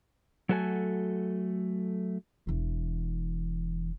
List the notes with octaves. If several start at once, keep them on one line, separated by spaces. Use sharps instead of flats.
F#3 A3 F#4 A4 G#5
E1 E3